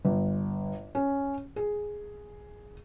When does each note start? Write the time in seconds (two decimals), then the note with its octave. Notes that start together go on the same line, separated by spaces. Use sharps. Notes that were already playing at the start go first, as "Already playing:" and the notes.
0.05 G1
0.95 C#4
1.56 G#4